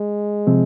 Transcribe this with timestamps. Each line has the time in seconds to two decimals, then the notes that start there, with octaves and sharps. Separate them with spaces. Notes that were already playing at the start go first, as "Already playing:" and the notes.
Already playing: G#3
0.47 C3 F3 C4